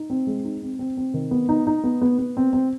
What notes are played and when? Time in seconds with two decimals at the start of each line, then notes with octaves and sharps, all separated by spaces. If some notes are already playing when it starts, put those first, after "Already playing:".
Already playing: D#4
0.10 C4
0.27 G#3
0.44 D#4
0.62 C4
0.79 C4
0.97 C4
1.14 D#3
1.31 B3
1.49 D#4
1.67 D#4
1.84 B3
2.02 B3
2.19 B3
2.37 C4
2.53 C4